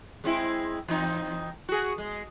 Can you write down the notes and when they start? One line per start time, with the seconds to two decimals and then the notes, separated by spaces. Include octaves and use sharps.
0.24 G#3 C4 E4
0.88 E2 C4 D#4
1.69 F#4 G#4
1.98 G#3